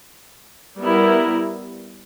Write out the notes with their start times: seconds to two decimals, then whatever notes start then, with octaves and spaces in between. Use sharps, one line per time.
0.80 G3 B3 E4 A#4